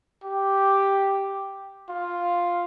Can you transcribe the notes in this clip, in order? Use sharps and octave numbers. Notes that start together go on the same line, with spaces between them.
G4
F4